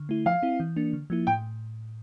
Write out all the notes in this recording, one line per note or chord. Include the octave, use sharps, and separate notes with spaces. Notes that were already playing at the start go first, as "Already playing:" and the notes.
Already playing: D3
A3 E4
F3 F5
C4 E4
E3
A#3 D4
D3
F3 A#3 E4
A2 G5